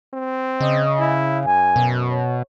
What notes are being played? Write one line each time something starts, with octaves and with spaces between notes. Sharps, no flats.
C4
C#3 D#5
E4
F#2 G#5
B2
C#5